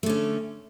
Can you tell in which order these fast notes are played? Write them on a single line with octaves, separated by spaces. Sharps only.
A3 D3 C#4